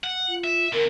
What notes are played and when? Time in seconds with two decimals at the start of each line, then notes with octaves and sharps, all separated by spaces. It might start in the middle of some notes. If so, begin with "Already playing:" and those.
0.04 F#5
0.28 F4
0.44 E5
0.73 E2 D3 A#4